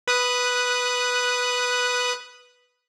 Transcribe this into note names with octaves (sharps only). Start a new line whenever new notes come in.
B4 D#6 F#6